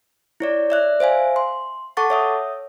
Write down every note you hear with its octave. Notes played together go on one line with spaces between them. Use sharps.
E4 C#5 D5
D5 E5 F#6
C5 E5 F5 G#5
C6
A4 F#5 A5 C#6 D6 A6
C#5 E5 D#6